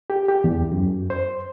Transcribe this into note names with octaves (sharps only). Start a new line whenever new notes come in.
G4
G4
E2
F#2
C5